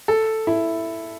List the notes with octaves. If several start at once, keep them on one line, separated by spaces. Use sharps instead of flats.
A4
E4